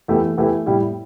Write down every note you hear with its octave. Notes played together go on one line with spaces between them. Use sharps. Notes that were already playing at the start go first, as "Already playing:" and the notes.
E2 E3 A3 E4 G4
E2 E3 A3 E4 G4
A2 G3 E4 G4